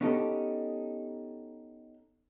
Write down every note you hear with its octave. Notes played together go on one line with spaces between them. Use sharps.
B3 C#4 D#4 G4 A4